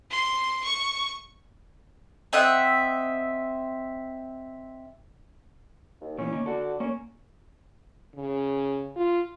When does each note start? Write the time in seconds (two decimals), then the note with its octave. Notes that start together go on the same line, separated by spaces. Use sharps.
0.10 C6
0.63 C#6
2.33 C4 D#5 E5 F#5
6.01 D#2
6.18 A#2 E3 C#4
6.33 D#3 A#3
6.46 D3 F#4 A4
6.80 A#3 C#4
8.16 C#3
8.96 F4